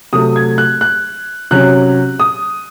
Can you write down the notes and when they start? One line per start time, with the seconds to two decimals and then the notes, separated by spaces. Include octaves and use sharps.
0.13 C3 F#3 A3 D#6
0.36 G#6
0.58 F#6
0.81 F#6
1.51 C3 F#3 C#4 F#6
2.20 D#6